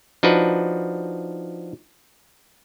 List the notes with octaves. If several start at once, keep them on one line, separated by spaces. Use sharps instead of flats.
F3 D4 D#4 F#4 B4